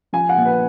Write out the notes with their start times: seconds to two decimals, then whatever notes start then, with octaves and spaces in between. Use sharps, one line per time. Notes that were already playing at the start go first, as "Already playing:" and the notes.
0.13 F3 G#5
0.29 F#5
0.37 A#2
0.45 B4